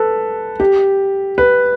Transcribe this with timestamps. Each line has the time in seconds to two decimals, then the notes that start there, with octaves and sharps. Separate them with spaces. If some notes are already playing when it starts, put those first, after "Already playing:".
Already playing: A4 B4
0.60 G4
1.38 B4